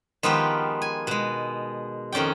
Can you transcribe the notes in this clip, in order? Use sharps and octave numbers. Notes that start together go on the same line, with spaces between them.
D#3 F3 G#3 B3 F4 G4
G#5
B2 G#3
F2 D#3 C#4 D5 G5